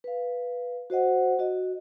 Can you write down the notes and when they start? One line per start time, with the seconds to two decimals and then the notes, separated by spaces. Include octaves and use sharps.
0.04 B4 F5
0.90 F#4 C5 D#5 F#5
1.39 F#4 D#5